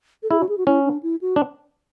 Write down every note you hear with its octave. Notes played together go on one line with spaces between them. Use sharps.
A4
E4 G#4
F#4
G#4
F#4
C#4 E4
D4
E4
F#4
D4